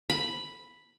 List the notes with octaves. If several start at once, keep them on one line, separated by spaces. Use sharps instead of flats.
B5